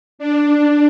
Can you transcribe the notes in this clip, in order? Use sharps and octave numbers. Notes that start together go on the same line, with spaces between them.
D4